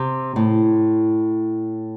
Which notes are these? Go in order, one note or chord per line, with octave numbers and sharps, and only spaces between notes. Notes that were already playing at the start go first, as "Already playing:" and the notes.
Already playing: C3
A2